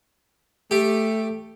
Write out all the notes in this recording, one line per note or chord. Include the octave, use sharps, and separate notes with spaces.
A3 G4